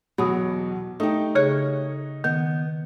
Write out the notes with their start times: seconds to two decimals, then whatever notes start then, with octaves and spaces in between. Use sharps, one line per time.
0.18 E2 B2 F#3 B5 D#6
1.00 A3 D#4 G4
1.35 C#3 G#4 C#5 F#6
2.24 D#3 B3